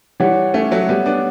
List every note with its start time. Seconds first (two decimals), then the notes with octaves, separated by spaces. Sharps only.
0.20 E3 G3 G4 C#5 F#5
0.54 A3 C#4
0.71 F#3 A3
0.89 G3 B3
1.06 B3 D4